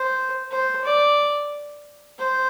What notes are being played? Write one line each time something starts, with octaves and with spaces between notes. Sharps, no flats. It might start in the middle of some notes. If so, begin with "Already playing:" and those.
Already playing: C5
C5
D5
C5